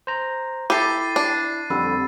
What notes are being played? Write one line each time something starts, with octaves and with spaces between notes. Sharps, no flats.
C5 A#5
E4 G4 A4 A6 C7 D#7
D4
F2 D3 G3 C4 B5 E6